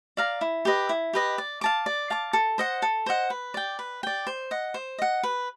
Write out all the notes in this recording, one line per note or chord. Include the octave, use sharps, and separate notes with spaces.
D5 F5 A#5
E4
G4 B4 D#5
E4
G4 B4 D#5
D5
F5 A5 D6
D5
F5 A5 D6
A4
C5 D#5 F#5
A4
C5 D#5 F#5
B4
D5 G5
B4
D5 G5
C5
D#5 F#5
C5
D#5 F#5
B4